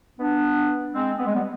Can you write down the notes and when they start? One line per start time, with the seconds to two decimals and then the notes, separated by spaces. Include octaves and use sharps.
0.19 B3 D4
0.94 G#3 C4
1.18 B3
1.26 G#3
1.34 G3 B3